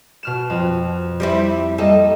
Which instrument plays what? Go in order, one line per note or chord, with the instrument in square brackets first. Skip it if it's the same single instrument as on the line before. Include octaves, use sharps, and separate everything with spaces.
[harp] B2 F6 E7
F2
[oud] G3 C4 E4 [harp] D5
[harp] G3 A#3 D#5 [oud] A4